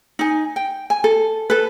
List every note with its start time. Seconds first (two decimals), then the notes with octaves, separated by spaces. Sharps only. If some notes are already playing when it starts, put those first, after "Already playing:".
0.19 D#4 G#5
0.56 G5
0.90 G#5
1.04 A4
1.50 A4 B4